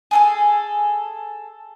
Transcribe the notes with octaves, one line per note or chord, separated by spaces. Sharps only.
G#4 A4 G#5